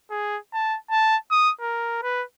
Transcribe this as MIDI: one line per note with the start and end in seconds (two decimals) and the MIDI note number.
0.11 0.38 68
0.53 0.77 81
0.91 1.16 81
1.31 1.51 87
1.61 1.98 70
2.03 2.23 71